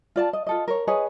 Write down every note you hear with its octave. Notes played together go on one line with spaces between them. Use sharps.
F4 D5 A5
D#5
F4 A4 D#5
A#4 C#5
G#4 B4 C#5 D#5